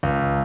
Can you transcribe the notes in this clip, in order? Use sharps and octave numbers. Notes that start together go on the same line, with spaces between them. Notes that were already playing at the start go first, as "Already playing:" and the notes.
C#2